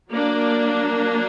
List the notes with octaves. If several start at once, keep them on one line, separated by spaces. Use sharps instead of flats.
F#3 A#3 D4 D5